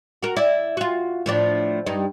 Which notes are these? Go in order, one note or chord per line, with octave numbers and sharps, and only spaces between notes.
F#4 A#4
E4 D5
F4 F#4
A2 F3 D4
G2 D#4